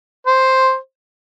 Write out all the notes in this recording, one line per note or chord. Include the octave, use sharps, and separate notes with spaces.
C5